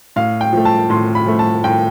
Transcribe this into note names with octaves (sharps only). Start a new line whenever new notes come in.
A2 F5
G5
F3 A3
A5
A2 C6
B5
F3 A3
A5
A2 G5